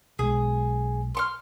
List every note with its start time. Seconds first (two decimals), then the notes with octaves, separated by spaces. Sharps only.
0.19 B1 G#3 G#4
1.15 C6 C#6 F6